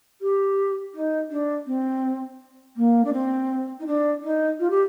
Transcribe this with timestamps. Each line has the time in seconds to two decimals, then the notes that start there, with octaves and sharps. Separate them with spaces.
0.21 G4
0.94 D#4
1.30 D4
1.66 C4
2.76 A#3
3.04 D4
3.12 C4
3.79 D#4
3.86 D4
4.22 D#4
4.59 F4
4.70 G4